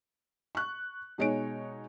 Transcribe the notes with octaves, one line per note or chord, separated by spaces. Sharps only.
C#6 F#6
B2 G#3 D#4 C#5 G#5 D7